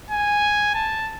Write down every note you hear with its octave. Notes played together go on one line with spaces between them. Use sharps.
G#5
A5